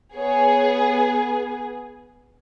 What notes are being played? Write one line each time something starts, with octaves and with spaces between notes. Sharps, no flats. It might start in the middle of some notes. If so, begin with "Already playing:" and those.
B3 G#4 C#5